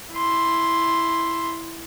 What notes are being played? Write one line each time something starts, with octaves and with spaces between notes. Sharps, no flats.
E4 C6